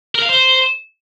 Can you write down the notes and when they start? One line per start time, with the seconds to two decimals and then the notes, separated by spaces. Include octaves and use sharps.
0.15 A#4
0.22 F5
0.29 C5